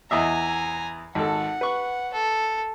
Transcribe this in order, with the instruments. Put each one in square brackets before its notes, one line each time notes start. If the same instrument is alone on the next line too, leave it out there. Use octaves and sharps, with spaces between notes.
[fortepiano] E2 D#5 E5 [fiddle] G#5 A#5
[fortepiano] G#1 A4 [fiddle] F#5
[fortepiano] B4 C#6
[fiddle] A4